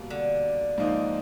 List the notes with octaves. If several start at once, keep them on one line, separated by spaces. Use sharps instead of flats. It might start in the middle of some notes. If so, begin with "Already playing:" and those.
Already playing: B2 G3 A#3
D3
G#2 F3 A#3 D#4